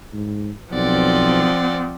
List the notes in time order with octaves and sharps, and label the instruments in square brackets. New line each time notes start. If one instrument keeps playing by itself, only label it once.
[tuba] G#2
[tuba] B1 [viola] F3 C4 [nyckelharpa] D5 F#5